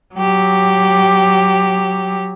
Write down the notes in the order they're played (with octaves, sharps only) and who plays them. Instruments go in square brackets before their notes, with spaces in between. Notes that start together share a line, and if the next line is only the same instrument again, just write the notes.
[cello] F#3 G4